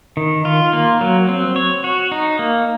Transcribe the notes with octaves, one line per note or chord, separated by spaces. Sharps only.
D#3
F4
A#3
F#3
C4
C#5
F#4
D#4
A#3